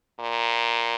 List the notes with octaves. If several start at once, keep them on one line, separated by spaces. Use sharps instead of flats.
A#2